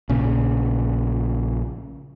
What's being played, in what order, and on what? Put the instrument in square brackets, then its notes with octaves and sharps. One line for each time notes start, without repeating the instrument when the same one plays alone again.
[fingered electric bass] A#1 A#2 C#3